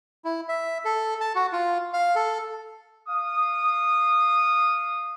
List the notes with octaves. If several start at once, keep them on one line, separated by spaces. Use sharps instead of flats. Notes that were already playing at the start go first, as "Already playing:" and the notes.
E4
E5
A4
A5
F#4
F4
F5
A4
F5 D#6